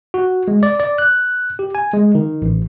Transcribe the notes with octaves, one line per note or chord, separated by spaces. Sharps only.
F#4
G#3
D5
D5
F#6
G4
G#5
G#3
D#3
A1